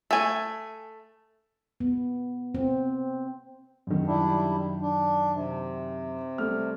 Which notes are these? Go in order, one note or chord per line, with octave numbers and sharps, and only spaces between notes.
A3 G#5
B3
C4
F#2 D#3
G3 D4 E4
D4
C3
G3 A3 F6